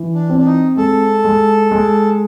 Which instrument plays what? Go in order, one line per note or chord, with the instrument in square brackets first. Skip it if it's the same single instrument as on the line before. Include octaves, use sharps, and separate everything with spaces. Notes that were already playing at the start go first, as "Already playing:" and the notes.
Already playing: [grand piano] E3
[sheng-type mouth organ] D4
[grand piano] C4
[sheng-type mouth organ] D4
D#4
[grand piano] G#3 [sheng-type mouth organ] A4
[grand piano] G#3
G#3